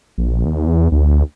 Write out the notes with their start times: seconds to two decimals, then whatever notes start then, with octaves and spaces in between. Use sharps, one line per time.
0.18 A#1
0.45 D#2
0.66 E2
0.92 D2